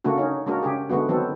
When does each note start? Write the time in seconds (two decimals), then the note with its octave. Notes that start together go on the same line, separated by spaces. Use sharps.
0.04 C#3 A3 A#3 D4 F#4
0.18 C#4 D#4
0.46 G#3 A#3 D4 F#4 A#4
0.63 C#3 G4 G#4
0.89 D3 G#3 A3 B3 F#4
1.09 D#3 F#3 B3 C4 A4